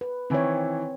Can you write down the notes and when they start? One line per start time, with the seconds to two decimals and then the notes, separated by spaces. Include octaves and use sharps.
0.01 B4
0.30 D#3 E3 C4 E4 C#5